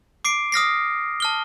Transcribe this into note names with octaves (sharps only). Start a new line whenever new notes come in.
D6 C7 D7
D#6 F6 A#6 C7
A5 F6 G7